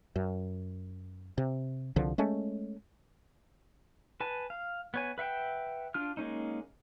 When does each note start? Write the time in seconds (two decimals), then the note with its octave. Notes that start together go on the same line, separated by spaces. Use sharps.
0.16 F#2
1.38 C3
1.96 C2 D3 F3
2.18 G#3 A3 C#4
4.20 B4 G#5 A5
4.50 F5
4.94 B3 C#5 G#5
5.18 B4 E5 F#5 G5
5.94 D4 F4 F6
6.17 G#3 A#3 C#4 D#4